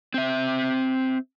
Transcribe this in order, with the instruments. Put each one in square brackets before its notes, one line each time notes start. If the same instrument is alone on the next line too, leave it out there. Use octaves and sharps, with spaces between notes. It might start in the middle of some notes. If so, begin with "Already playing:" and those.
[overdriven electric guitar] C4 E5